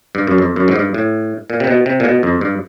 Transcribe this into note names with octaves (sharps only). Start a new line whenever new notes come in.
G2
F#2
F2
F#2
G#2
G2
A2
A#2
C3
B2
C3
A#2
B2
F2
G2